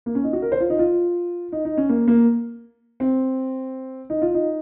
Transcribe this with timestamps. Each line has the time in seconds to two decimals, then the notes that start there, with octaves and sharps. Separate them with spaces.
0.06 A#3
0.15 C#4
0.24 D#4
0.33 F#4
0.42 A#4
0.52 C5
0.61 F4
0.70 D#4
0.79 F4
1.52 D#4
1.65 D#4
1.77 C#4
1.89 A#3
2.08 A#3
3.00 C4
4.10 D#4
4.22 F4
4.34 D#4